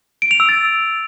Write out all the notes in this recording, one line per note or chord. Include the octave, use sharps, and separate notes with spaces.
D7
F7
E6
A6